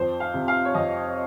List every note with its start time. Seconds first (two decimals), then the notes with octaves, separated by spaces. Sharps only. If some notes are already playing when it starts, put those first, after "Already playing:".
Already playing: F2 C5
0.20 F5
0.34 C3
0.48 F5
0.65 C#5
0.74 F2 D#5